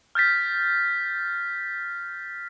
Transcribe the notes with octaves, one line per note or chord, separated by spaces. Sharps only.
F6 G6 A6 B6